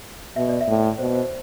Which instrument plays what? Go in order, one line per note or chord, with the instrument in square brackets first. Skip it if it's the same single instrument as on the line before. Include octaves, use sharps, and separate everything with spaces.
[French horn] B2 [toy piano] E5
[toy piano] D5
E5
[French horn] A2
[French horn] B2 [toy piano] C5
[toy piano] C5